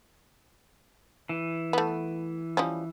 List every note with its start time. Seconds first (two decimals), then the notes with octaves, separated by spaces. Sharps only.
1.29 E3
1.73 A3 B3
2.57 F3 G3 C#4